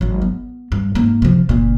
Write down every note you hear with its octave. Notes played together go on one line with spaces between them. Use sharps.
G#1 F#3
B3
G2
G#2 A#3
C3 F3
F#1 A#2